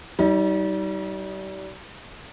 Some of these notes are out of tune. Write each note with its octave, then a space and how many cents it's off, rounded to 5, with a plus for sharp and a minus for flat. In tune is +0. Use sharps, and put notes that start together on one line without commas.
G3 -35 D#4 +25